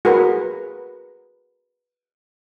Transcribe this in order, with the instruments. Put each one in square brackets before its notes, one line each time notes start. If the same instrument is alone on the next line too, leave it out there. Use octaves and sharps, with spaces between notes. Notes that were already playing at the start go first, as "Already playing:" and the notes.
[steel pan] F#4 G#4 A#4 B4